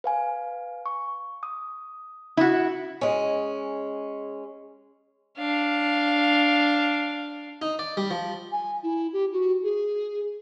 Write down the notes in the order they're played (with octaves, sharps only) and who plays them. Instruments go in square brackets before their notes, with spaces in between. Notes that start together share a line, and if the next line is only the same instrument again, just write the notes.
[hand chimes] B4 F5 G#5
C#6
D6 D#6
[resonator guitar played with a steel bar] E4 F#4
[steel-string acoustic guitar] G#3 C#4
[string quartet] D4 F5
[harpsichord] D#4
D5
G3
F3
[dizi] G#5
E4
G4
F#4
G#4